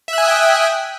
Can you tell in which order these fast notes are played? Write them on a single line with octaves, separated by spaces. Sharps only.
E5 F#6 G#5 D#6 G5